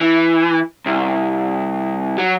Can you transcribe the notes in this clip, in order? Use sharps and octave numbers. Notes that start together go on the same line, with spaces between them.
E3
C2
F#3